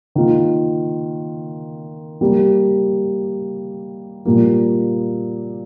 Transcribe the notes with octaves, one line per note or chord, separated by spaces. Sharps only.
D#3 A#3 F4
G3 A#3 G4
A#2 G3 A#3